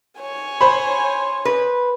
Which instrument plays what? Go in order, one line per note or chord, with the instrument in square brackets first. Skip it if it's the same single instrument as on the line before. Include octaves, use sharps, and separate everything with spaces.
[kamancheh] C#5 G#5
[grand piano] C5 B5
[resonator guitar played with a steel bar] B4